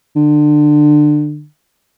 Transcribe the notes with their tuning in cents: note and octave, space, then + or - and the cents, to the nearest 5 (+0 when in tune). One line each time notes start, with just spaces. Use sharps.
D3 +25